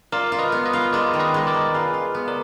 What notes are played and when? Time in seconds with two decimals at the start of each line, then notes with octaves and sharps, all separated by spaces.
0.12 F4 A#4 D5
0.32 F4
0.39 B4 D#5
0.52 B3
0.66 B4 D#5
0.73 F4
0.93 G#3 A#4 D5
1.14 D#3
1.20 B4 D#5
1.34 G#3
1.47 A#4 D5
1.54 G#3
1.74 F4 G#4 B4
1.94 F4
2.15 B3
2.28 A#4 D5